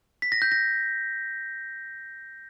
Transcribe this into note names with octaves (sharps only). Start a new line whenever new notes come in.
B6
A#6
G6
A#6